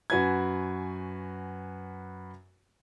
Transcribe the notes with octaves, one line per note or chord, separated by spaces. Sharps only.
F#2 F#4 B4 G#5 G#6